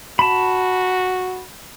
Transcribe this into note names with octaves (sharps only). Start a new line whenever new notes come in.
F#4 A5 B5